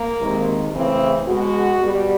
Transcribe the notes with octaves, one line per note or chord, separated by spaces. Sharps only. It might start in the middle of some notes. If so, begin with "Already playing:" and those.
Already playing: A#3
C3 D#3 G#3
C#3 E3 A3 C4
B2 G#3 F#4
B2 G3